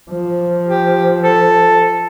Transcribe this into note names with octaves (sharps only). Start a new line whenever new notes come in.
F3
G4
A4